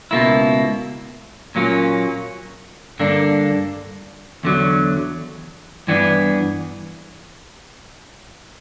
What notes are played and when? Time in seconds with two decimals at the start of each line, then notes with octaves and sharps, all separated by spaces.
0.11 C#2 B2 A#3 E4
1.55 A#2 F#3 A#3 C#4
2.99 G2 D3 A#3 D4
4.43 E2 D3 F#3
5.87 G2 E3 B3 D4